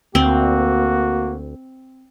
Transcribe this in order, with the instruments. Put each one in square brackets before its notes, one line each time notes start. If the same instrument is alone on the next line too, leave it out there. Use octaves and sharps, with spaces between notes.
[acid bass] D2 [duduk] A#3 [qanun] C4 [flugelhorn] F#4